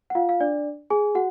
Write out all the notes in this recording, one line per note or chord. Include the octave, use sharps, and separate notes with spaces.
F#5
F4 F5
F5
D4 D5
G#4 G#5
F#4 F#5